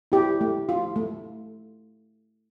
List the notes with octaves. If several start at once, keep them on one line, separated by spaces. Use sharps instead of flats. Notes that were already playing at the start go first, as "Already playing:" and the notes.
E4 G4
A3
F4
A3